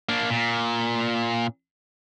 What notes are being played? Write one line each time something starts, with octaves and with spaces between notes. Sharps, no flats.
A#3 D4
A#2